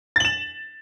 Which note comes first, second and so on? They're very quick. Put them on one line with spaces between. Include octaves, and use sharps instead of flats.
A6 F#7 E7